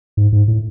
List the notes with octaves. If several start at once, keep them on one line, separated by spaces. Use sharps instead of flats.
G#2
G#2
A2